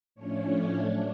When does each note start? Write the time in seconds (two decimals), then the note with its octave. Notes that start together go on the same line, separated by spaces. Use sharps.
0.15 A2 F3 A3 C#4 D4 C#5
0.76 F#3 A3 C#4 D4 C#5